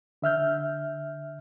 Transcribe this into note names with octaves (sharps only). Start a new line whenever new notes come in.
D3 E5 F6 G6